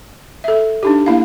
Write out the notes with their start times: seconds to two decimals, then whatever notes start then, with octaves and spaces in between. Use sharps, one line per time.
0.44 A4 E5
0.83 D4 D#4 G4
1.06 A#3 E4 F5